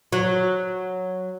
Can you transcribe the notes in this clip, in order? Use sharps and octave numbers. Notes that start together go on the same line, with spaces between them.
F#3